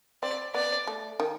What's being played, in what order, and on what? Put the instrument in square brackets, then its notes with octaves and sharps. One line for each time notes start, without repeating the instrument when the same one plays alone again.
[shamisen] C4 [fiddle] D5
[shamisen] B3 [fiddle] D5
[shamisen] A3
D#3